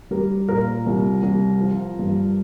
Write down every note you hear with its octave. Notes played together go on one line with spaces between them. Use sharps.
G3 A#4
A#2 A#4
C2
C2
F3
G2